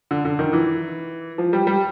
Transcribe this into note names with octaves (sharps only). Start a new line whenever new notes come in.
D3
D3
D#3
E3
F3
G3
G3